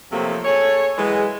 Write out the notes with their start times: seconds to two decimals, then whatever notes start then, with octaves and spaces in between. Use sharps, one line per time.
0.12 C3 F3 F#3 A3 A#3
0.45 G#4 A4 C#5
0.97 E3 F#3 G#3